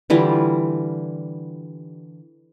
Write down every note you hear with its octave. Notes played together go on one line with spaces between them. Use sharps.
D3 E3 G3 F4